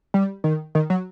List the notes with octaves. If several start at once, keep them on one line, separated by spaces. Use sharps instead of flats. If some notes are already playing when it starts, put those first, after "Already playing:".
G3
D#3
D#3
F#3